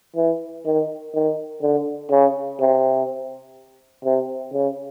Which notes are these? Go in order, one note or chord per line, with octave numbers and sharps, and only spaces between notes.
E3
D#3
D#3
D3
C#3
C3
C3
C#3